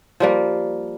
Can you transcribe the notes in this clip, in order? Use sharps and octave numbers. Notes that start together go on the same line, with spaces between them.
F3 G3 A#3